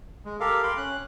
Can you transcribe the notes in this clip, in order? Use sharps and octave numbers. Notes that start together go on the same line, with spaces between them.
G#3
G4 A4 A#4 F5
F5 G5 B5 C6
C#4 F#6